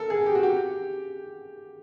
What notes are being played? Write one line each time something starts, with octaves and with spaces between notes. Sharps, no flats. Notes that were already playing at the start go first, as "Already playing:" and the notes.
Already playing: A4 A#4
G#4
G4
F#4
G4